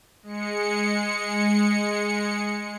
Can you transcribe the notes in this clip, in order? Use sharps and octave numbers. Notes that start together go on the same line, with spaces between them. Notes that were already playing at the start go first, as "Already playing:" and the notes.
G#3 C#7